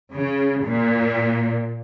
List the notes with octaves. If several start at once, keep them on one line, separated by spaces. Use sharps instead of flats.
C#3
A#2